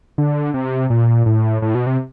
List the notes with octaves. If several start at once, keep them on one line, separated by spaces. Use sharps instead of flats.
D3
C3
A#2
A2
A2
B2
C3